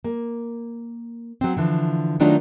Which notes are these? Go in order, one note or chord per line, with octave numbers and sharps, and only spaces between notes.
A#3
F#3 C4
D3 E3 F3
D#3 F#3 A3 D4 D#4 F4